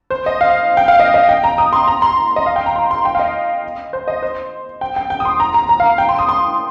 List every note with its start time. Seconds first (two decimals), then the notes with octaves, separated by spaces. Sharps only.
0.10 C5
0.26 D#5
0.41 F5
0.77 G5
0.88 F5
1.00 D#5
1.14 D#5
1.29 G5
1.44 A#5
1.58 D#6
1.73 C6
1.88 A#5
2.02 C6
2.36 D#5
2.46 F5
2.56 G5
2.66 A#5
2.76 C6
2.91 C6
3.05 G5
3.15 F5
3.19 D#5
3.93 C5
4.08 D#5
4.23 C5
4.81 G5
4.96 G5
5.10 G5
5.20 D#6
5.25 C6
5.40 A#5
5.54 A#5
5.69 A#5
5.80 F5
5.98 G5
6.09 C6
6.19 D#6
6.29 C6